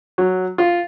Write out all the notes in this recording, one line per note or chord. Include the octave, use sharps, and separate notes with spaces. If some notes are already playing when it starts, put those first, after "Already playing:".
F#3
F4